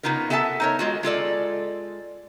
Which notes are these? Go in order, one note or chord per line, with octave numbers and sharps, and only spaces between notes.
C#3 B3 D#4 F4 A#4
B3 A4 E5 G5 A5
D#4 A#4 C#5
G#3 F4 F#4
G#3 F4 A4 D5